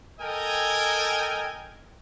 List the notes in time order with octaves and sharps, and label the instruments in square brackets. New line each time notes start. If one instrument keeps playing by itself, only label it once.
[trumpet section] A4 A#4 D#5 G5 G#5